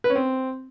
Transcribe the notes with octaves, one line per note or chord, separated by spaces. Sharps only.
B4
C#4
C4